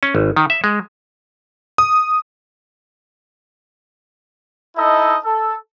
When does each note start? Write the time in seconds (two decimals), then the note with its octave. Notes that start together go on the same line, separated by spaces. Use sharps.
0.03 C#4
0.15 G#1
0.36 D#3
0.50 E5
0.64 G#3
1.78 D#6
4.77 D#4 E4 A4 D#5
5.25 A4